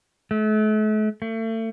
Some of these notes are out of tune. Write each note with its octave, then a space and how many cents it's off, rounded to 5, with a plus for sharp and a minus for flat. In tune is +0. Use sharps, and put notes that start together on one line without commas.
A3 -40
A3 +35